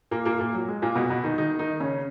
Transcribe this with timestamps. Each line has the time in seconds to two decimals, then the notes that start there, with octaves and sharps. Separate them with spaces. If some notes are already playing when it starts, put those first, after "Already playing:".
0.11 A#2 A#3
0.25 A#2 A#3
0.39 A#2 A#3
0.54 F#3
0.68 G#3
0.82 A#2 A#3
0.95 B2 B3
1.10 B2 B3
1.24 D#3 D#4
1.38 D#3 D#4
1.59 D#3 D#4
1.80 C#3 C#4